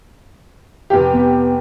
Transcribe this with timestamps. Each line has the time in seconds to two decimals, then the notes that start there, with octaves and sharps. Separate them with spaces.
0.90 F1 G4
1.13 B3